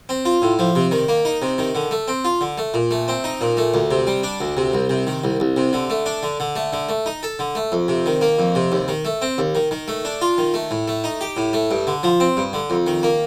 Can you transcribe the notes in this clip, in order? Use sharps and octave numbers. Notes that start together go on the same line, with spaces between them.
C4
F4
A2
F3
C3
D#3
A#3
D#4
C3
D#3
D3
A3
C4
F4
D3
A3
A#2
A3
C4
D#4
A#2
A3
D2
C3
G3
D4
D2
C3
C2
C3
D#3
C2
C2
C3
D3
A3
D4
D3
D3
A3
D3
A3
D#4
A4
D3
A3
F2
C3
D#3
A#3
F2
C3
D#2
D#3
A3
C4
D#2
D#3
D#3
A3
D4
F4
D#3
A3
A2
A3
D#4
G4
A2
A3
G2
D3
F3
C4
G2
D3
F2
D#3
A#3